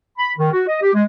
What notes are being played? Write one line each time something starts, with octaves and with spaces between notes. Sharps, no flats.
B5
D#3
F#4
D#5
G4
G#3